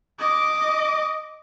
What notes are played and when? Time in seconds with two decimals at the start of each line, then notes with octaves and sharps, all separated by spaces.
0.19 D#5 D6